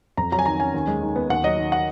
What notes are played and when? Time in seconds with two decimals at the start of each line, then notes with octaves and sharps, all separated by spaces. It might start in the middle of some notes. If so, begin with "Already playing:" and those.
0.17 F2 A#5
0.32 F#3 A#5
0.39 G#5
0.46 D#3 A#5
0.60 C#4 G#5
0.74 D#2
0.87 G#3
1.02 D#3
1.16 B3
1.29 D#2 F#5
1.43 F#3 D#5
1.57 D#3
1.72 F#5